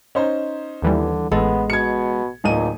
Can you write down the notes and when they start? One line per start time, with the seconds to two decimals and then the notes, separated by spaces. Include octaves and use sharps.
0.15 C#4 D#4 C5
0.82 D#2 D3 E3 G3
1.32 A1 G#3 B3 A4
1.70 B2 G#6 C#7
2.44 D1 A#2 D#4 D#7